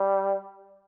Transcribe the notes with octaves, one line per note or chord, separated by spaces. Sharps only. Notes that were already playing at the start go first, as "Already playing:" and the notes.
Already playing: G3